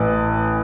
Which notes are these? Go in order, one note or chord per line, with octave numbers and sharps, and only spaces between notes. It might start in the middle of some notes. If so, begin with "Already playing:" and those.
Already playing: A1 A2 E3 B4